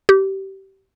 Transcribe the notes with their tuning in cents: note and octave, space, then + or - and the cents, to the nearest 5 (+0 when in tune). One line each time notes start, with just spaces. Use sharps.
G4 -25